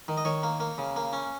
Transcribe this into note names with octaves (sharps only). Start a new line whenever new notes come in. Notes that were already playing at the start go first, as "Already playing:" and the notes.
D#3
D#5
D#3 C#5
A#3
A#3
C#3
A#3
C#4